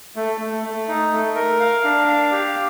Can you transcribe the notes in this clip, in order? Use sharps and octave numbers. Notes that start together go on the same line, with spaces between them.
A3
A3
A3
D#4
A3
A#4
F5
D4
F5
G4